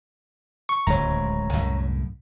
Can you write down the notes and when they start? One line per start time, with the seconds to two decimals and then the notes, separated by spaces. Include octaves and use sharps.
0.69 C#6
0.87 D1 C#2 G#3 C#5 A#5
1.53 C2 F#2 A2